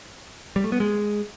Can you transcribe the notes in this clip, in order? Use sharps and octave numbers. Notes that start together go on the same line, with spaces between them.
G3
A3
B3
G#3